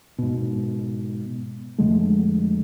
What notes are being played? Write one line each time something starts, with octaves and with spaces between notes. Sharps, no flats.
G#2 B2
F2 D3 G#3 A3